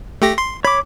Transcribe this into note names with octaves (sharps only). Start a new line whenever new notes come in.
A3 G4 A#6
C6
C#5 B5 D6